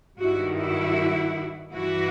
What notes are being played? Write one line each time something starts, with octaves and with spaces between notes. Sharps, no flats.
G2 D#3 E4 F#4
E4 F#4
G2 E3 E4 F#4